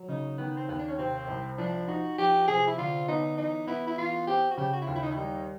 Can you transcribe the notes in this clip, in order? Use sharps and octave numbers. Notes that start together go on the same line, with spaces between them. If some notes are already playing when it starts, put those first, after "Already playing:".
Already playing: F#3
C#3 D#4
D#3 B3
C4
D#2 B3
D4
C#4
C3 C4
C2
F3 D4
D#4 F#4
F3 G4
C3 G#4
E4
D3 F4
B3 D#4
E3 D#4
B3 E4
E4
E3 F4
C4 G4
F#4
C#3 G4
F#4
E4
D#2 F4
E4
D#4
E4
G3 D#4